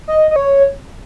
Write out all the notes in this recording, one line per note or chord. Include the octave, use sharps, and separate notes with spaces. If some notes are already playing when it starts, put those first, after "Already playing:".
D#5
D#5
C#5